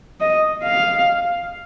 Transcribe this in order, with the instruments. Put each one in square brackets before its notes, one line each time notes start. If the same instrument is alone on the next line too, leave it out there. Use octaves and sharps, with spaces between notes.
[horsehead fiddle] D#5
F5